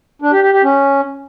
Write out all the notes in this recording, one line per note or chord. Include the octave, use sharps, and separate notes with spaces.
D4
G4
G4
G4
C#4